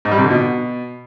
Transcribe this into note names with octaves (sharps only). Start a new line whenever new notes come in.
G#2
G3
C3
D3
B2